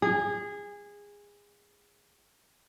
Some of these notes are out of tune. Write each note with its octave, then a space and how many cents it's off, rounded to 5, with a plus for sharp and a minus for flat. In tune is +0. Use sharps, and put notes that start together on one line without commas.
G#4 -20